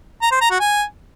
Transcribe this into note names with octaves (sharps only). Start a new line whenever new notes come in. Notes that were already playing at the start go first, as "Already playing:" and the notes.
A#5
C5
A#5
F#4
G#5